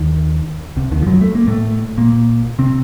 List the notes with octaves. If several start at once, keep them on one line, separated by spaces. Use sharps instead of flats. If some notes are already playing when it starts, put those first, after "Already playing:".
Already playing: D#2 D#3
C2 C3
D#2 D#3
F3
F#2 F#3
A3
A#3
A2 A3
A#2 A#3
C3 C4